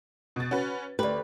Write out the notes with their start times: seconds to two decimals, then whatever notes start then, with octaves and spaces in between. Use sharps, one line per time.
0.36 B2 A6
0.51 C#4 F#4 B4
0.99 D2 G4 B4